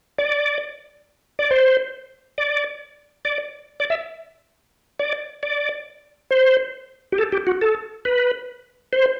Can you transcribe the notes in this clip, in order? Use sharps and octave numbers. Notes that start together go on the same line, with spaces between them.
D5
D5
C5
D5
D5
D5
E5
D5
D5
C5
G4
A4
G4
F#4
A4
B4
C5